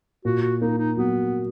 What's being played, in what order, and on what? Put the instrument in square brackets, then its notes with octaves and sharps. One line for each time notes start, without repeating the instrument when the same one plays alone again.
[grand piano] A#2 [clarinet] F#4
[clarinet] F#4
[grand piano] A#3 [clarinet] D#4
[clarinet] D#4
[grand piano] F#3 [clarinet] B3